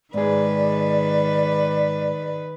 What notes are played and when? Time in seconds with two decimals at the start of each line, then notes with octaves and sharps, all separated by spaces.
0.14 G#2 D#3 G#4 B4 D5